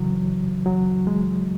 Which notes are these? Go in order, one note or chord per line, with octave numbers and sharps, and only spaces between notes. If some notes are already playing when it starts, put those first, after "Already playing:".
Already playing: F#2 C#3 E3 F#3
F#3
G#3